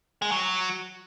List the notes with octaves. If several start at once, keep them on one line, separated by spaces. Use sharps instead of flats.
G#3
F#3